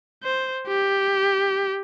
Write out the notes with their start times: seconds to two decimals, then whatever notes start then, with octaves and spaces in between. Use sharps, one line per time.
0.24 C5
0.68 G4